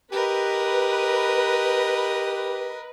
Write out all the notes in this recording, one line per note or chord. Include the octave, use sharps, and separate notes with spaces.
G4 A#4 B4 D#5